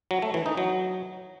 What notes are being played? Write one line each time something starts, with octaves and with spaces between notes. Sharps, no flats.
F#3
A3
E3
D#4
F#3